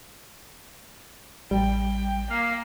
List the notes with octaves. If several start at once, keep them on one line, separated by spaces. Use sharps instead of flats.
A1 G3 G5
A#3 F5